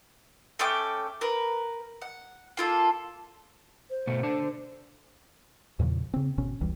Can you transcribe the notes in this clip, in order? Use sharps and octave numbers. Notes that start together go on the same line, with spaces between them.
A3 C#4 G5 D6
A#4 B4
F#5
A#3 F4 A4
C5
B2 A3 B3
D4 A4 A5
E2 A#2 C#3 F3
C#3 C4
G#1 B2 C#4
F1 C#2 E3 G3